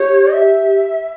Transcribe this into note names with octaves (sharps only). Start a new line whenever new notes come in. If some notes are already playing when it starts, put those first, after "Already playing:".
Already playing: G4 C#5
E5